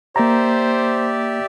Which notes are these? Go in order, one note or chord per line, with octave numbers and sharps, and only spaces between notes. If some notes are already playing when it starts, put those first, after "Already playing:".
A#3 G4 C5 D5 E5 A#5